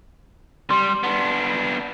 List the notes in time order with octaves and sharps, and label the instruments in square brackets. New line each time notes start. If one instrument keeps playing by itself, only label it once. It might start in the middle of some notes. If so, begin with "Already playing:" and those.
[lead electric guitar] G3 [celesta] C6
[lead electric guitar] B3 D4